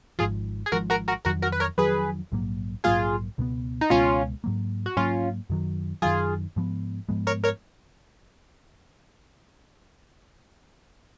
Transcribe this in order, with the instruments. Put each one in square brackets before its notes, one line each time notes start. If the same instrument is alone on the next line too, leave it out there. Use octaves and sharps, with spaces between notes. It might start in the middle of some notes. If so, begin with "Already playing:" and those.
[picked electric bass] G#1 G#2 F3 [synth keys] F4 G#4
[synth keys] G#4
[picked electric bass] G#1 G#2 F3 [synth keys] F#4 A#4
[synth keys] F#4 A#4
F#4 A#4
[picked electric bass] F2 D#3 F#3 [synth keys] F#4 A#4
[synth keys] F#4 A#4
B4
A#4 C#5
[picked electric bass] F2 D#3 F#3 [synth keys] G#4 B4
[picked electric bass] A#1 G#2 F#3 A#3
[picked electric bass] A#1 G#2 F#3 A#3 [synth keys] F4 G#4
[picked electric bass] C#2 B2 G#3 B3
[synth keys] D#4
[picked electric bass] C#2 B2 G#3 B3 [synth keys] C#4 F4
[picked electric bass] G#2 F#3 A#3
[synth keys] F#4
[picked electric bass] G#2 F#3 A#3 [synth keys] C#4 F4
[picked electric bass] F#2 D#3 F#3
[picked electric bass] F#2 D#3 F#3 [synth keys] F4 G#4
[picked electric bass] G#2 F3 G#3 B3
G#2 F3 G#3 B3
[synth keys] A#4 C#5
A#4 C#5